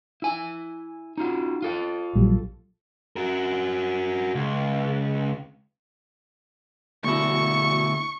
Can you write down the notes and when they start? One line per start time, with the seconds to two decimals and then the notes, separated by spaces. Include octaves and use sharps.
0.22 E4 G#5
1.18 D#4 F4 F#4
1.62 F4 A4 F5
2.15 A#1 F#3 G3
3.16 F#4 A#4
4.35 C#2
7.04 D2 B2 E4 C#6